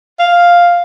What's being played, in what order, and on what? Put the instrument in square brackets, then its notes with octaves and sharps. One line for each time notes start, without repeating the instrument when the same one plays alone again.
[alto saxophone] F5